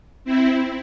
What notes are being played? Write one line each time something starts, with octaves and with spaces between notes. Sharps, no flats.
C4 E4